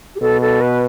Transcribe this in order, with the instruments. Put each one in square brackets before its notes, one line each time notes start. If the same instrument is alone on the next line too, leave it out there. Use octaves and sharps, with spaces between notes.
[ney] G4
[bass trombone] B2 [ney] A4
[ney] A4
B4